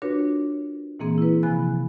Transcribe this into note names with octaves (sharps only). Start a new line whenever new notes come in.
D4 F4 F#4 A#4 B4 C#5
A#2 E3 A#3 C4 G#4
E4 B4
C3 F3 G#5 B5 F#6